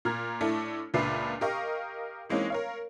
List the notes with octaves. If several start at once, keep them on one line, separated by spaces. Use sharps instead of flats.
A#2 A#5 F6 G#6
A2 A3 D4 E4
C#2 A#2 D4 B4 E5 C7
G4 A#4 D#5 F5 C#6
E3 G#3 A#3 C4 C#4 D#4
A#4 C#5 F5